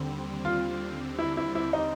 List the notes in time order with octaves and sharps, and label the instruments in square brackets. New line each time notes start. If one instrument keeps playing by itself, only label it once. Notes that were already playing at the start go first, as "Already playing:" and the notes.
Already playing: [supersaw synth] D#2 D3 G3 C4
[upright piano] F4
E4
E4
E4
D#4